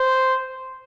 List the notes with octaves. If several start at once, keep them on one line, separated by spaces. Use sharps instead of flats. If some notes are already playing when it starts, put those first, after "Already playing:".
Already playing: C5